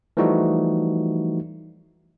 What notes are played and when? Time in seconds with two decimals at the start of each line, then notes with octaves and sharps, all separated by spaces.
0.17 E3 F3 G3 A3 D#4 F#4